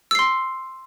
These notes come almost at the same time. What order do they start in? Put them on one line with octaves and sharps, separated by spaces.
E6 C7 C6